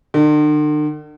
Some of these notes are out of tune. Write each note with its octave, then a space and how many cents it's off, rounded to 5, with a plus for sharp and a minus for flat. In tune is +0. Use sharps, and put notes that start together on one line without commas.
D3 +45